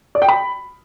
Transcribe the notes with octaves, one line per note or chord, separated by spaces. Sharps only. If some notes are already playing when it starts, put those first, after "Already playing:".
D5
G5
B5